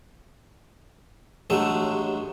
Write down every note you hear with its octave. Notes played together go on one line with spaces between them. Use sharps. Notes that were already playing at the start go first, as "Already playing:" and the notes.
A1 G2 F#3 G#3 A3 E5